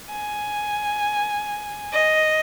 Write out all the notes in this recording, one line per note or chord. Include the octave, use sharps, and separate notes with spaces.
G#5
D#5